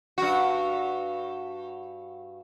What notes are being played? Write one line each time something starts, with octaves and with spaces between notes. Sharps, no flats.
G2 F#4